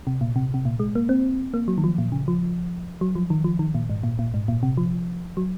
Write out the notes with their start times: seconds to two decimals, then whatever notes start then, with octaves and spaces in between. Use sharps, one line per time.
0.07 C3
0.21 A#2
0.36 C3
0.54 C3
0.65 A#2
0.80 G#3
0.95 A#3
1.09 C4
1.54 A#3
1.68 F#3
1.78 D#3
1.84 F3
1.98 A#2
2.12 C#3
2.28 F3
3.01 F#3
3.15 F3
3.30 D#3
3.44 F3
3.59 D#3
3.74 A#2
3.89 G#2
4.03 A#2
4.19 A#2
4.34 G#2
4.48 A#2
4.63 C3
4.77 F3
5.37 F#3